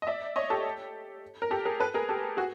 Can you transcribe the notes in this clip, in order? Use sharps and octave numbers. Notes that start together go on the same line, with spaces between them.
D#5
D5 E5
C#5 D#5
G4 A4
A#4
G4 A4
G#4 A#4
A4 B4
G#4 A#4
G4 A4
F#4 G#4